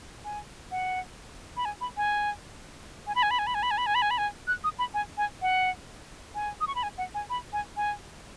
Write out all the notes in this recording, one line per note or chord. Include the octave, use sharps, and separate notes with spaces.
G#5
F#5
B5
G#5
B5
G#5
G#5
B5
G#5
B5
G#5
B5
G#5
B5
G#5
B5
G#5
B5
G#5
B5
G#5
F#6
D#6
B5
G#5
G#5
F#5
G#5
D#6
C#6
B5
G#5
F#5
G#5
B5
G#5
G#5